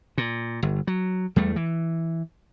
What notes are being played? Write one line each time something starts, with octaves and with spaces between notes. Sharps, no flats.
A#2
G1
F#3
E2 G3 A3
E3